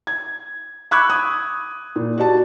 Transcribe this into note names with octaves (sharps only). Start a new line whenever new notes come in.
G#6
B5 C#6 D6 E6 F#6 G#6
D#6
A#2
F#4 G4 D5 A5